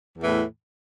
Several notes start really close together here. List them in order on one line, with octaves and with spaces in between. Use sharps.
E2 E3 A2